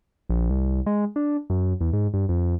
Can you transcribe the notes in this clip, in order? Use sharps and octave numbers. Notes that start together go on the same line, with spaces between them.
A#1
C2
G#3
D4
F#2
E2
G#2
G2
F2